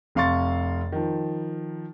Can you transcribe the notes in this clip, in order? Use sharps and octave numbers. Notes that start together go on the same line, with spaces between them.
F1 C3 F5 C6 C#6 A6
D#3 F3